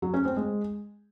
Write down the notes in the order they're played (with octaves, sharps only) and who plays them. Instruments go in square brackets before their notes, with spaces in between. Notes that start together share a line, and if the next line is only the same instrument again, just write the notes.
[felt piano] F#3
C#4
C4
G#3